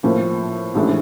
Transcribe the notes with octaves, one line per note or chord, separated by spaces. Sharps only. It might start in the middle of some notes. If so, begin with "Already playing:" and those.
A2 F3 A#3
A1 G#2 E3 A3 D4